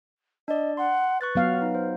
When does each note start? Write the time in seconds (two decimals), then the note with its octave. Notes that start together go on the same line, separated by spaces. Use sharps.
0.48 D4 D5 D#5
0.77 F#5 C6
1.21 B4 C#6 F#6 A6
1.35 F#3 B3 F5
1.62 D#4
1.75 C5